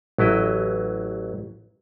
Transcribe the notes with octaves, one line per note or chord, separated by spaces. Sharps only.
A1 F#3 E4 D#5